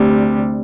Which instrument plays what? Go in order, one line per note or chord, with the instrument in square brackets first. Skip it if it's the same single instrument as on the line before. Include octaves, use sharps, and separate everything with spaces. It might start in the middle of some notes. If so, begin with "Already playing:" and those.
Already playing: [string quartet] D2 C3 G3